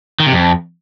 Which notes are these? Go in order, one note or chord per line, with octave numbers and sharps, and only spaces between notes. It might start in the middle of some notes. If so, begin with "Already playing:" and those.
D#3
C3
F2